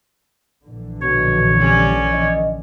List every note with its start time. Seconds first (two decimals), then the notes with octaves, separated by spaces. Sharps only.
0.65 A#1 D3 E3
1.01 B2 C#5
1.60 G3 C#4 D5
2.13 D#5